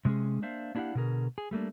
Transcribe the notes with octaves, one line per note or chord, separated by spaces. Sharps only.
C3 G#3 B3 C#4 G#4
A#3 D4 C5 E5 F5
A#3 D4 E4 G4 F5 F#5
B2 D3 G#4 A#4
G#4
G3 A3 A#3 D4